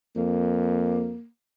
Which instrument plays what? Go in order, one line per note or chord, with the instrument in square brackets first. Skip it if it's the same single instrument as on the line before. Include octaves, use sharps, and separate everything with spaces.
[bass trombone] F2 [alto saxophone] A#3